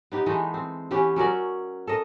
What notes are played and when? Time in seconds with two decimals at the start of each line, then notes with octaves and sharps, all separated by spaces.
0.12 B3 D#4 G4
0.26 E3 G#3 A3 D#4
0.54 C4
0.91 E3 B3 C#4 G4
1.16 F#3 C#4 A#4 D5
1.87 A4 A#4 D#5